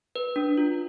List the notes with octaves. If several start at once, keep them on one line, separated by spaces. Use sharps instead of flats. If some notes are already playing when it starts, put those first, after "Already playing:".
B4
D4
F4